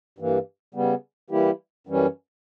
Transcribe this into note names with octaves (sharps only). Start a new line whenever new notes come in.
G2 E3 A#3
C#3 G3 B3
E3 G3 A#3 E4 G4
F#2 E3 G3 C#4